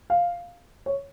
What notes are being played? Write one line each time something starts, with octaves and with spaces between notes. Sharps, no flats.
F5
C#5